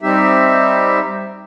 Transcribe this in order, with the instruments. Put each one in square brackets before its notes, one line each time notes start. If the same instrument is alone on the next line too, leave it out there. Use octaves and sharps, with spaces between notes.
[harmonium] G3 C4 D#4 G4 E5